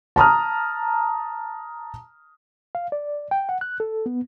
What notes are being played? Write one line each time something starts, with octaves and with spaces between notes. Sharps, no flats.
A5 A#5 D#6 F6
F5
D5
G5
F#5
F#6
A4
B3